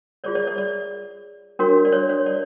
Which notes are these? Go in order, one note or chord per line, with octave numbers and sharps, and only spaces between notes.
F4 G#4 C#5 D5
D5
D5
D5
D4 F#4 A#4 C#5
D5
C#5
C#5
D5